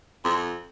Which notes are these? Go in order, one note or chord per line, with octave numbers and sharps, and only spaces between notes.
F2